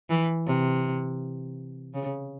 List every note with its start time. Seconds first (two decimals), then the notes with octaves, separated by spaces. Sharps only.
0.10 E3
0.47 C3
1.94 C#3